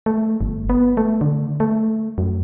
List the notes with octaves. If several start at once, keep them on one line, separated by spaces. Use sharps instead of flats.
A3
G1
B3
A3
D3
A3
F#2